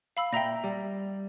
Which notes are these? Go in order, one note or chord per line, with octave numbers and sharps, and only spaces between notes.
F5 B5 E6
A#2 E5 G5 A#5 A#6
G3